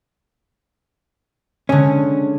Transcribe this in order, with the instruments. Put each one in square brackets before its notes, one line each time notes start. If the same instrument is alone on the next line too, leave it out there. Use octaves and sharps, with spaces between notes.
[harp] D3 G#3 [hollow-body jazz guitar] C#4